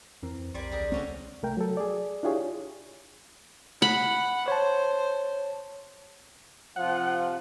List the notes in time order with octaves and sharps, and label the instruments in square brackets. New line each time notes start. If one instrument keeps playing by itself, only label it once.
[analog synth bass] F2 [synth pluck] E3 C4 A#4
[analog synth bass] B1 [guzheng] G3 D5 G#5 [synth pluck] A#4 C6
[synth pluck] D#2 A#6 [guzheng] G4 G#4 A#4
[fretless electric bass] C#2 C4 [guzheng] D3 C#4 F#4
[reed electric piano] C2 A3 A#4 G5
F#3 A4
G#4 D5
D4 E4 F4 G4 G#4 C#5
[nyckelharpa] F#5 [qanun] B5
[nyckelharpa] C5 [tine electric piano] C#5 A5
[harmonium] C3 F4 [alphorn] F3 [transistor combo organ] F#5